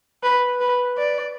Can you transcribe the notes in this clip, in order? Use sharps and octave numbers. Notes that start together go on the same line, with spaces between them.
B4
B4
D5